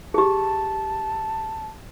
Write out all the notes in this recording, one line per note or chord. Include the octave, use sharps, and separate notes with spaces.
G4 G#4 A5